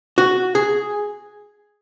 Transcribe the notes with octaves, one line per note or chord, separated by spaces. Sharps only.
F#4
G#4